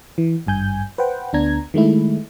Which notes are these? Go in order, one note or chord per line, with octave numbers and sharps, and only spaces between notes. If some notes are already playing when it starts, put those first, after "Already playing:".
E3
G#1 G2 G#5 G6
B4 C5 F#5 G5
D2 B3 D4 A#5 G#6
D#3 G#3 A3 E4